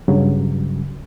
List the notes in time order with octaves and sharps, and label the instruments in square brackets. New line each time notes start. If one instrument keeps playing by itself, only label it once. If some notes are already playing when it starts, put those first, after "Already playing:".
[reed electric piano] G2 C#3 F#3